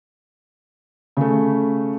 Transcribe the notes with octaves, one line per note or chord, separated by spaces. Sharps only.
C#3 A3